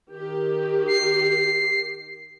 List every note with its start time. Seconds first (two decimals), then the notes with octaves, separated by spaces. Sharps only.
0.13 D#3 G4
0.87 C7